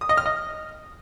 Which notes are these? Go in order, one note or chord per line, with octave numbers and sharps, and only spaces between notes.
D#6
D#5
F6
D#5